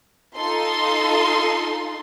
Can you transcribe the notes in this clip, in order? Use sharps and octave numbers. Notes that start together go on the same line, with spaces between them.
D#4 F4 A4 C6